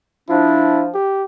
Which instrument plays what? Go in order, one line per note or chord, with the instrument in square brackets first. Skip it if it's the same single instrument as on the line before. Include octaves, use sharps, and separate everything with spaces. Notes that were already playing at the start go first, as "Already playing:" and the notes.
[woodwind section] F3 D4 [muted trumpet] E4
[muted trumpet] G4